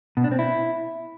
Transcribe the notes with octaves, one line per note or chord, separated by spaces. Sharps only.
B2
D4
C4
E4